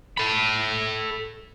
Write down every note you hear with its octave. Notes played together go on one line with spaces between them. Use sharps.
A4 B5